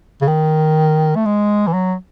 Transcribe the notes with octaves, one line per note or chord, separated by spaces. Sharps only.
C#3
D#3
A3
G#3
E3
F#3